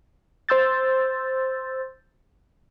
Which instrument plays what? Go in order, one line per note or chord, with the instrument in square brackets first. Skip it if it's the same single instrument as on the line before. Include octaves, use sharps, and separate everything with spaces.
[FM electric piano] C5 C6 E6 G6 A6